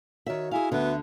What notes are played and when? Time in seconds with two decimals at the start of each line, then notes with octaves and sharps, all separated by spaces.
0.26 D#3 F#4 C#5 E5
0.51 E4 G#4 F5 G#5
0.72 D2 D3 B3 E5